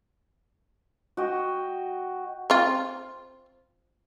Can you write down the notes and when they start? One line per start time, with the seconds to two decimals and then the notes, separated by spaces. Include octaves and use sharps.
1.17 F#4 D#5 G5
2.50 C4 F4